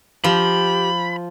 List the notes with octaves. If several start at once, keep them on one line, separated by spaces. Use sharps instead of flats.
F3 G4 B5